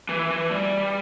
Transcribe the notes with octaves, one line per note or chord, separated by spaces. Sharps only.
E3
E3
G3